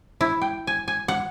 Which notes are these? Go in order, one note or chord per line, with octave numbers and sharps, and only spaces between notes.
E4
G5
G#5
G#5
F#5